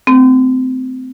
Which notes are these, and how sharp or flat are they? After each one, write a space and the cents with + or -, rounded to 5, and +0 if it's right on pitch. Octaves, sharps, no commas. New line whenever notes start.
A3 +0 C4 -25